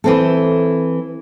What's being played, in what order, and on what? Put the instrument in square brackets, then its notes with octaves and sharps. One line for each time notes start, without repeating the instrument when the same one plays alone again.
[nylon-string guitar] E3 C4 A4